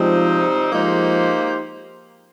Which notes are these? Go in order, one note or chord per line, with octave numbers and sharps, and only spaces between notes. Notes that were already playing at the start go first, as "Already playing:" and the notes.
Already playing: C3 F3 G3 G#3 C4 D#4
F3 G#3 A#3 D#4 G4 C5